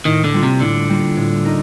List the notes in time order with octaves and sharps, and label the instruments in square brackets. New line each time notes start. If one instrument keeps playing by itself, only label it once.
[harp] A2 [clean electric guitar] D#3
[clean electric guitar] D3
[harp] G3 A#3 F4
[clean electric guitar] C3
[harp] A2 [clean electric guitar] D3
[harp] G3 A#3 F4
A2
D#4 A#4